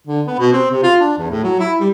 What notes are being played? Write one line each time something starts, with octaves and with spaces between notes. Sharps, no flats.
D3
B3
B2
C4
C3
F4
D4
E2
A2
F#3
E4
G3